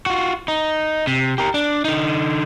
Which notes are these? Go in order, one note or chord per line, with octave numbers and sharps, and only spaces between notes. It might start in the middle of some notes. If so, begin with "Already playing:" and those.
F4 F#4
D#4
C3
G4 A#4
D4
D3 D#4